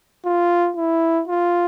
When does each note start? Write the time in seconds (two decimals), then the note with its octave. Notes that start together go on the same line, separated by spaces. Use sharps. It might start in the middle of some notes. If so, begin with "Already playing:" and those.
0.25 F4
0.77 E4
1.28 F4